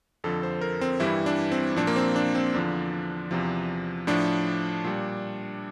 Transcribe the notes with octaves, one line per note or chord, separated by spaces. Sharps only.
F2 D3 F3 A4
C5
A#4
C4
G2 E3 G3 E4
D4
C4
A#2 F3 D4
A#3
C4
D4
C4
E2 D3 F3 D4
E2 C3 F3
A2 F3 D4
A#2 G3